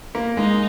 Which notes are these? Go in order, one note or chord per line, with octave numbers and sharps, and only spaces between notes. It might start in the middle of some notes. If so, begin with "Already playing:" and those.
A#3
G#3 D#4